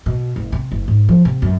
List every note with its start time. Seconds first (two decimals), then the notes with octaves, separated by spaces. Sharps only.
0.06 B2
0.36 F#1
0.52 C3
0.72 F#1
0.88 G#2
1.09 F3
1.25 C3
1.42 F#2